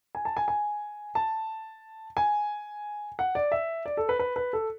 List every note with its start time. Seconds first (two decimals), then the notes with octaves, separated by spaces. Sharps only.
0.15 G#5
0.25 A5
0.37 G#5
0.48 G#5
1.15 A5
2.17 G#5
3.19 F#5
3.35 D5
3.52 E5
3.86 D5
3.97 A4
4.09 B4
4.19 B4
4.36 B4
4.53 A4